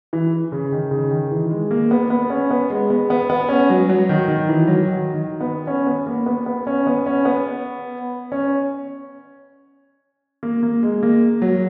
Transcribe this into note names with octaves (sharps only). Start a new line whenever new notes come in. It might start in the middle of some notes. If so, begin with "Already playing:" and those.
E3
C#3
D#3
C#3
D#3
E3
G#3
A#3
B3
B3
C#4
B3
G#3
B3
B3
B3
C#4
F#3
F#3
D#3
D#3
E3
F#3
D#3
D#3
B3
C#4
B3
A#3
B3
B3
C#4
B3
C#4
B3
C#4
A#3
A#3
G#3
A#3
F#3